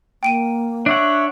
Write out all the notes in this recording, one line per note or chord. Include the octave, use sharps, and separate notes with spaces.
A#3 G5 D7 D#7
D4 C#5 E5 F#5